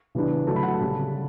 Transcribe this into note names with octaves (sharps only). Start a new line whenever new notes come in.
C#3 E3 G3 B3 D4
D3 F#3 A3 A5
B5
F#5 A5
C#3 G3 C#4